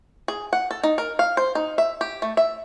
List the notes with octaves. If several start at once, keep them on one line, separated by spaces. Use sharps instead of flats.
G#4
F#5
A4
D#4
A#4
F5
C5
D#4
E5
G4
A3
E5